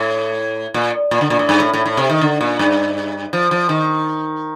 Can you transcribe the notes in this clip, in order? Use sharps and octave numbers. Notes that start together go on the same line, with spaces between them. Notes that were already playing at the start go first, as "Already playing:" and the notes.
Already playing: A2
A#2
A#2
D3
A#2
A2
G2
A2
A2
A2
C3
D#3
D3
A#2
G2
F3
F3
D#3